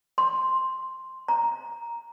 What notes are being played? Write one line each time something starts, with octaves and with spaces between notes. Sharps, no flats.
C6
A#5